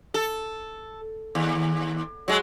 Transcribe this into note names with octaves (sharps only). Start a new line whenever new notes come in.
A4
D#2
F#3 G#3